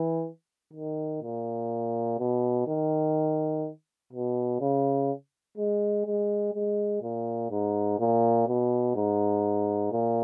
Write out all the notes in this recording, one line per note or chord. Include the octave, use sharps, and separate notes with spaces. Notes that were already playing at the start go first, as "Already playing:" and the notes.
Already playing: E3
D#3
A#2
B2
D#3
B2
C#3
G#3
G#3
G#3
A#2
G#2
A#2
B2
G#2
A#2